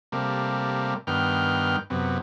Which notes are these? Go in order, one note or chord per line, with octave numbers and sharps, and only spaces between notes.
C3 G3 A3 A#3
G2 D#3 B3 G5 F6
F#2 C3 B3